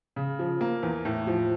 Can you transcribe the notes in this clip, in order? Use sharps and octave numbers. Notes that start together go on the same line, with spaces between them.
C#3
F3
A#3
E2
A2
F3